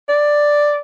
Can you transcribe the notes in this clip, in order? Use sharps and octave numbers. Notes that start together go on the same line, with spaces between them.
D5